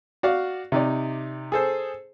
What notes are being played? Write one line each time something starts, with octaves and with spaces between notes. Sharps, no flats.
F#4 D5 F5
C3 D#4 D5
G#4 A4 C5